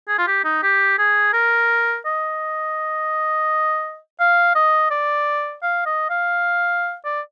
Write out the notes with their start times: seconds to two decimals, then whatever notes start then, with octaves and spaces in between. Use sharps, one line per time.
0.08 G#4
0.19 F4
0.27 G4
0.44 D#4
0.63 G4
0.99 G#4
1.33 A#4
2.06 D#5
4.20 F5
4.55 D#5
4.91 D5
5.63 F5
5.86 D#5
6.10 F5
7.05 D5